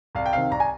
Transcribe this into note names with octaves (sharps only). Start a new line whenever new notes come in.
C2 F5
G5
C3 D#3 F5
C2 A#5
G#5